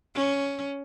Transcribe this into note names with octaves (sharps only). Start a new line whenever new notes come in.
C#4